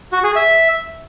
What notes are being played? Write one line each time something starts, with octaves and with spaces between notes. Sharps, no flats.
F#4
G#4
E5